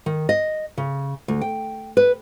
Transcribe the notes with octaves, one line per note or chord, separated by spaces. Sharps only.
D#3
D#5
C#3
D2
G5
B4